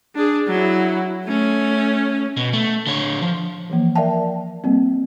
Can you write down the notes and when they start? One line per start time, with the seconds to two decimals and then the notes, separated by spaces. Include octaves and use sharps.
0.15 D4 G#4
0.48 F#3 E4
1.25 A3 C#4
2.37 B2
2.53 A3
2.87 D3 C#5
3.22 F3
3.70 E3 F3 A#3
3.95 A#4 D5 E5 F5 G5 A5
4.64 G3 A#3 C4